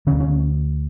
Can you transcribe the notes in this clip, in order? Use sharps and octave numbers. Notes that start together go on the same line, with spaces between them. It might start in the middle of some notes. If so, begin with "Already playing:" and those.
D2 D3 C#4
C#4